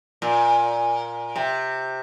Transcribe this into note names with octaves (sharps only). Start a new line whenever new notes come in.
A#2
C3